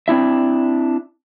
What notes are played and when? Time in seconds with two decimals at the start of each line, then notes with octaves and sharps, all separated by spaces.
0.08 C4 D4 E4 E5